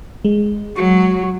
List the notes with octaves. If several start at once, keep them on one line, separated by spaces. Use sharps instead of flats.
G#3
F#3 F#4